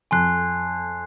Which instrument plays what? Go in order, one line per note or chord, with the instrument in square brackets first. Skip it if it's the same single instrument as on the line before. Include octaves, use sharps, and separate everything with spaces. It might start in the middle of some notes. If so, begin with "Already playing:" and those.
[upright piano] F2 [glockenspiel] G#5 C6 F#6 C7